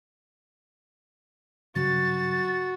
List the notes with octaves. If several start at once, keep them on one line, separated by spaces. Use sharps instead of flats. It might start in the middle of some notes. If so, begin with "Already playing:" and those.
G2 C#3 F#3 F#4 A6